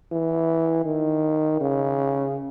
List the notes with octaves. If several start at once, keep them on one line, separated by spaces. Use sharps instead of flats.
E3
D#3
C#3